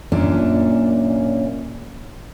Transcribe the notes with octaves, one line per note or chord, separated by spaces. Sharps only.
F#2 A#2 A#3 C#4 D4